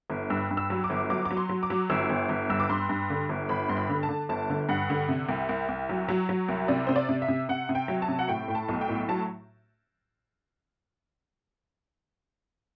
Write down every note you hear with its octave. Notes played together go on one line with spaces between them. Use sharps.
G1
G2 E6
G2
E6
F#3
D6
G1
F#3 D6
D6
F#3
C6
F#3
D6
F#3
G1 E6
G1
G1
G2 E6
D6
G2 C6
G2
D3
G1
G1 B5
G2 C6
B5
D3
A5
D3
G1 A5
D3
G2 F#5
D3
C3
C2
C2
C2
F#3
F#3
F#3
C2
C3 D5
C3 C5
D5
C3
E5
C3
C3 F#5
C3
G5
F#3
A5
C3
F#5
A2 G5
A2 G5
A5
B1
G5
A2
F#3 A5